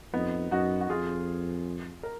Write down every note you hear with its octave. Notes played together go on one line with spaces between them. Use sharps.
F2 B3 D#4
F#2 D#4 F#4
F#4
F2 F4 G#4
A#4